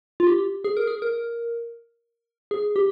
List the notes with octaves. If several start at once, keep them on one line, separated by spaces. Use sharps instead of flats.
F4
G4
G#4
A#4
G#4
A#4
G#4
G4